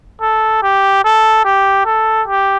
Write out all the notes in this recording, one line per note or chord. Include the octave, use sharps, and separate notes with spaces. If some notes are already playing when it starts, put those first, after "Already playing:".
A4
G4
A4
G4
A4
G4